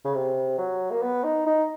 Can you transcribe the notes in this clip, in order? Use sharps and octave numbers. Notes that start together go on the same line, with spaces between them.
C#3
C3
F#3
A#3
B3
D#4
D#4